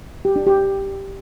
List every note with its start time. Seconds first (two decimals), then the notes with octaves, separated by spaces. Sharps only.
0.25 G4
0.36 D4
0.47 G4